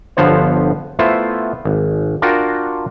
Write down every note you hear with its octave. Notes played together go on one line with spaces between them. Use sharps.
G1 D3 F3 B3 C5 C#5
A3 B3 E4 F4 C5
G#1
D4 F4 F#4 A#4 G5